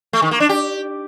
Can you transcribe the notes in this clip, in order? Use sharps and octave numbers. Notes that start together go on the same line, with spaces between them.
A3
D#3
A#3
D4
G4